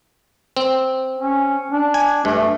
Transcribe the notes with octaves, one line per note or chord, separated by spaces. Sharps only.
C4
C#4
D4
G#5
G2 A3